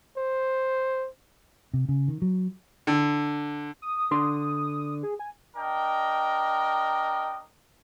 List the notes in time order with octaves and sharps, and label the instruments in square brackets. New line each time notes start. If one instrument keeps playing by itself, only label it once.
[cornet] C5
[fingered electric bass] C3
C#3
D#3
F#3
[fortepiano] D3
[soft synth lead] D#6
[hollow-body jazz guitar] D3 D4 C6
[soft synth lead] G#4
G#5
[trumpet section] D4 A#4 D#5 G5